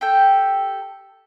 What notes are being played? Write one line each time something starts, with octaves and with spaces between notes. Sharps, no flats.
G4 A4 G5